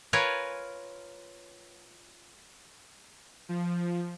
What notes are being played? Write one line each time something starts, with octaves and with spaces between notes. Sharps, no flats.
F4 A#4 B4 C#5 G#5
F3